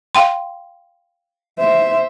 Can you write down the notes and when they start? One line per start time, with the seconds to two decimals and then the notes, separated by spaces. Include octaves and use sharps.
0.15 F5 G5 C6
1.59 C5 E5